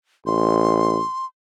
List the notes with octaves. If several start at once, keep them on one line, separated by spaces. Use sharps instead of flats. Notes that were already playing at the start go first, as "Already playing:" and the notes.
A1 C6